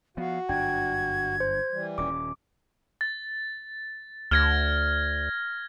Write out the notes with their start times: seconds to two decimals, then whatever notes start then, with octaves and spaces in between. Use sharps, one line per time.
0.17 F3 B3 F#4 F5
0.49 G1 F#2 D4 G5 G#6
1.40 C5
1.72 E3 G3
1.98 D#1 C#4 D6
3.01 A6
4.31 D2 F6 G#6 A#6